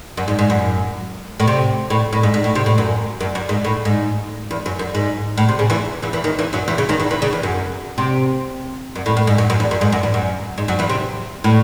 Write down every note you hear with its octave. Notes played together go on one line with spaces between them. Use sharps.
F#2
G#2
G#2
F#2
A2
C3
A2
A2
G#2
G#2
A2
C3
A2
F#2
F#2
F#2
G#2
A2
G#2
E2
F#2
F#2
G#2
A2
C3
C#3
E2 E3
E2 E3
E2 E3
D#2 D#3
E2 E3
F#2 F#3
E2 E3
C#3
D#2 D#3
E2 E3
E2 E3
C#3
E2
F#2
C3
F#2
A2
A2
G#2
F#2
F#2
E2
F#2
G#2
F#2
E2
F#2
G#2
F#2 F#3
E2 E3
C3
A2